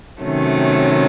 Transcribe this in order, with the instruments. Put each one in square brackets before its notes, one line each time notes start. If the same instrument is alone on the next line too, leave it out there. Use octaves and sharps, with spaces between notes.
[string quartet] C3 D#3 F#3 A3 C#4